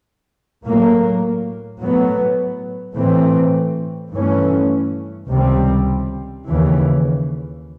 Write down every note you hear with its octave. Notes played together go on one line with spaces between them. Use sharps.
A2 F#3 A#3
A2 F#3 B3
A2 E3 A3 C4
G2 E3 A3 C#4
C#2 C3 D#3 G3 C4
D#2 C#3 E3